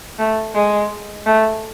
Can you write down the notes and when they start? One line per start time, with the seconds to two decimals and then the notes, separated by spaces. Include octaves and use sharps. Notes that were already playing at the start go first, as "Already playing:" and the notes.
0.19 A3
0.55 G#3
1.26 A3